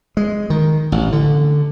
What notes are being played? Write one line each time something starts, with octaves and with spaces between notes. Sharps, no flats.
G#3
D#3
A1
D3